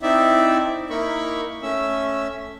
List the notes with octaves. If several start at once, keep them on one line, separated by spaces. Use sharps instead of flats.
C4 D#4 E4 D5 E5
A#3 D#4 E4 A#4 B5 C#6
A3 C#4 E5 E6